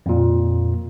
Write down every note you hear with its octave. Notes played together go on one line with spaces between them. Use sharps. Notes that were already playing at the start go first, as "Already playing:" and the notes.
F2 A#2